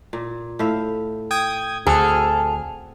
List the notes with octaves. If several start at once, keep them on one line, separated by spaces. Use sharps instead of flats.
A#2
A2 E5 F5
G5 D#6 G#6
D2 C4 F#4 G#4 A4 F6